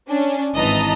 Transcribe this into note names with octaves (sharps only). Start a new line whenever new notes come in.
C#4 D4
G#1 E3 D#5 A5 A#5